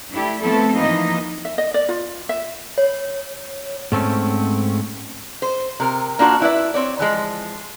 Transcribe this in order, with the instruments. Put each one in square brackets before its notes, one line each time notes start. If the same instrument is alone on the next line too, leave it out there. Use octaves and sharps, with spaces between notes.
[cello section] A3 D4 E4 G4
F3 A3 B3 C4 E4 A4
E3 F3 A#3 D#4 D#5
[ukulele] E5
D#5
D5
F4
E5
[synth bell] C#5
[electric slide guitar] G#2 A3 C4 C#4
[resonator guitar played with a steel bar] C5
C3 A#4
A#3 D4 F4 F#4
E4 B4 D5 E5
C4 C#5 D5
E3 F3 G#3